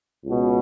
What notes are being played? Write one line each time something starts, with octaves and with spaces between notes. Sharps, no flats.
C#2 B2